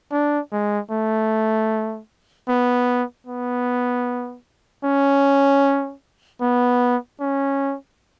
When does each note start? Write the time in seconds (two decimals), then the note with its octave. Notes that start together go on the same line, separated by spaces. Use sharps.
0.12 D4
0.52 G#3
0.91 A3
2.48 B3
3.27 B3
4.84 C#4
6.41 B3
7.20 C#4